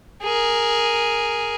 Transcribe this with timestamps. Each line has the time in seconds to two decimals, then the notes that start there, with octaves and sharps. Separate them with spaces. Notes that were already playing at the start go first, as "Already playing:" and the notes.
0.22 G#4 A#4